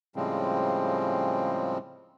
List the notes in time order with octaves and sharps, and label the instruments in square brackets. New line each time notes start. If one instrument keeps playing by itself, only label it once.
[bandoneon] A2 C#3 F3 G3 G#3 C4